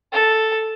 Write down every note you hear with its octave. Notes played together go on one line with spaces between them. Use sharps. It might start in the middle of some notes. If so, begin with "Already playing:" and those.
A4